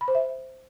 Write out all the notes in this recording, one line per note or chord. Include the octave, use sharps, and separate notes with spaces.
B5
C5
E5